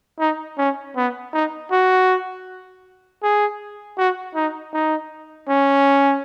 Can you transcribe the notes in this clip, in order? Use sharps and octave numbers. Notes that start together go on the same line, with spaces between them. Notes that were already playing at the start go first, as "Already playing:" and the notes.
D#4
C#4
B3
D#4
F#4
G#4
F#4
D#4
D#4
C#4